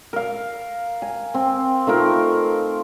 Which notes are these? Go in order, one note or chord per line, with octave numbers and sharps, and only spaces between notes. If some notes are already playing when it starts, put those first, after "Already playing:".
A#4 F5
G#5
C4
A3 D#4 F4 A#4